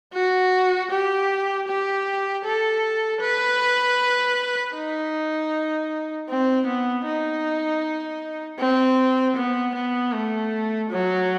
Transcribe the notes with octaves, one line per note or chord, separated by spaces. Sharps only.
F#4
G4
G4
A4
B4
D#4
C4
B3
D#4
C4
B3
B3
A3
F#3